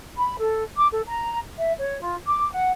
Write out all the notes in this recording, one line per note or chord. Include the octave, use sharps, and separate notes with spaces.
B5
A4
D6
A4
A#5
E5
C#5
F4
D6
F#5